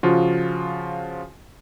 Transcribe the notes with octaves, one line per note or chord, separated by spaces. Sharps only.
C#3 F3 F4 F#4